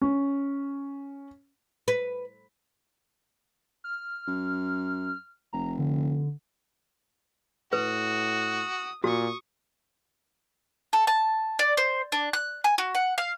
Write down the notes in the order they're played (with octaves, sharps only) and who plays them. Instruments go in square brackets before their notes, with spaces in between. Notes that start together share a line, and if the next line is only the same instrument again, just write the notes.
[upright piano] C#4
[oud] B4
[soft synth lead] F6
[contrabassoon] F#2
[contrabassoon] F1 [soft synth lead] A#5
[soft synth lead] D3
[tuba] A2 [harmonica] F#4 [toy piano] B4 [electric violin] D#6
[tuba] A#2 [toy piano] F#4 [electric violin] C#6 D#6
[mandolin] A4
A5
D5
C5
D4
F#6
G#5
F#4
F#5
F5